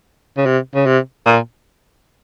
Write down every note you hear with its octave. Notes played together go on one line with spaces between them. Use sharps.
C#3
C3
C#3
C3
A#2